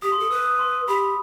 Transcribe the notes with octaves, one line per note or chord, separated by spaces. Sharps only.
G4 D#6
C6
A4 D#6
B4 E6
D#6
C6
G4 B5